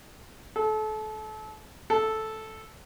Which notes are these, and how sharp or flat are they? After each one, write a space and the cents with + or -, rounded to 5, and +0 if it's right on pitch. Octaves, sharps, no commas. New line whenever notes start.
A4 -30
A4 -5